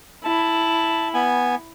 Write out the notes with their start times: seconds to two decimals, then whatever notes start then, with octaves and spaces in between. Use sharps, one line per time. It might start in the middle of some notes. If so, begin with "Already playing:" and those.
0.24 E4 A5
1.14 B3 G#5